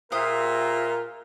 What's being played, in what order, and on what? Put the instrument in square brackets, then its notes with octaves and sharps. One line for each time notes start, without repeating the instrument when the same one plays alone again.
[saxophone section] A#2 F4 [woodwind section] G4 G#4 E5 [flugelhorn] A#4 [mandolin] C5 D#6